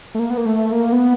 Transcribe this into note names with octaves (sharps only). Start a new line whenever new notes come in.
A3
A#3
B3
A#3
A3
A#3
B3